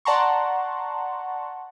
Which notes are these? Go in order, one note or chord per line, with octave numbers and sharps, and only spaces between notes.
D5 F#5 A5 A#5 C6 C#6